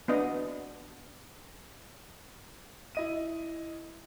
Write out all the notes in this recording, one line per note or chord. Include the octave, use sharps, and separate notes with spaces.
B3 D4 D#5
E4 D#5 D#7